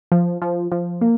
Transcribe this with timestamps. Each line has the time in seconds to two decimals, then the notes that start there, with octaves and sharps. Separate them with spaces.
0.12 F3
0.42 F3
0.72 F3
1.01 A#3